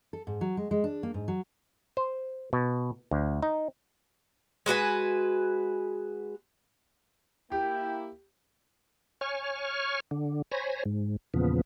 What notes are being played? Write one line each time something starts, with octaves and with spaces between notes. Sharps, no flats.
A4
G#2
F#3
G#3
G#3
D4
A#3
G#2
F#3
C5
B2
D2
D#4
G#3 F#4 B4 G#5
A#3 E4 G4 G5
C#5 G#5 C#6 F6
D3
C5 C#5 G#5 B5 A#6
G#2
E2 A#2 C#3 F3 B3